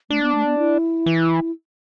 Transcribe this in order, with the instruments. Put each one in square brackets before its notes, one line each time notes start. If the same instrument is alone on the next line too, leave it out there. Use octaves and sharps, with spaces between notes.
[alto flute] A3 [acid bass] D4
[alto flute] B3
A3
B3
E4
[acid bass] E3